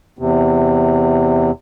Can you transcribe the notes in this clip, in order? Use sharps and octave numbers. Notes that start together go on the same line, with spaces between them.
E2 C3